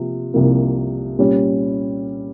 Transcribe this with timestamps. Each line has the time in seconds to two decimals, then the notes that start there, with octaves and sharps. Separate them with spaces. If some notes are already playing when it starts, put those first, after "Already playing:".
Already playing: C3 F3 A#3
0.34 C2 C3 F3 A#3
1.19 A#2 G3 C#4